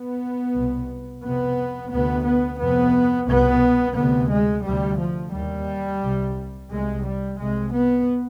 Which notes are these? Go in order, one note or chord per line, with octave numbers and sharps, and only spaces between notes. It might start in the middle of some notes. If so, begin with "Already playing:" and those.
Already playing: B3
C2 B2
F2 C3 B3
D2 C3 B3
B3
F2 C3 B3
C2 B2 B3
D2 C3 B3
G#3
D2 C3 G3
F3
D#2 G3
C2 C3
C2 C3 G#3
G3
C2 C3 G#3
B3